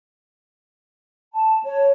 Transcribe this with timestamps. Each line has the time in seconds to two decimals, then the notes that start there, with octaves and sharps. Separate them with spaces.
1.34 A5
1.64 C#5